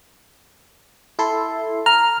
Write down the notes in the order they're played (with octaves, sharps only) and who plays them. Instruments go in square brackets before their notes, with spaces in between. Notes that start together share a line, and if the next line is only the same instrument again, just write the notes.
[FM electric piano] E4 A4 C6
[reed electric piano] A#5 [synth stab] F6